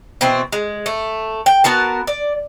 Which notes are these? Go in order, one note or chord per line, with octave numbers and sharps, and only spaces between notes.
B2 E3 C4
G#3
A3
G5
B3 F#4 A#4 A5
D5